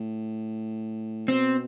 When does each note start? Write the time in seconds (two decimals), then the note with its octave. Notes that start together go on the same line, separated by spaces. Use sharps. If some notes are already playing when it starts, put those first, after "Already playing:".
Already playing: A2
1.28 B2 C4